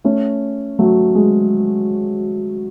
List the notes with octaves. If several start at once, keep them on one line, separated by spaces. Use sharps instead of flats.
A3 C#4
F#3 A3
G#3